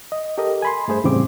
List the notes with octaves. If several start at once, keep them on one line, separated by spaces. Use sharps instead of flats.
D#5
G4 A4 A#4 D#5
G#5 B5 C6
G2 A3 G#4 C5
E2 A2 C#3 G3 C4 D6